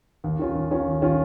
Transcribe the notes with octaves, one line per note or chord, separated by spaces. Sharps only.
D#2
D#3 C#4 F4
D#2
D#3 C#4 F4
D#2
D#3 C#4 F4